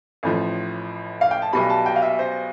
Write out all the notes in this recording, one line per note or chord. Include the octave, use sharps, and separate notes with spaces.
A1 A2 F3
F5
G5
A5
B1 B2 G3 B5
A5
G5
F5
E5
C5